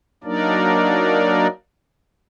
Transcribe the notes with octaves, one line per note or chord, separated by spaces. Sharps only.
F#3 A#3 D4 D#4 A#4 D5